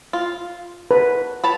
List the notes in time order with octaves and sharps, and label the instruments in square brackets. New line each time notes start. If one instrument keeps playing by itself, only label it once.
[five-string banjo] F4
[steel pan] B4
[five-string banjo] C#5 A5 B5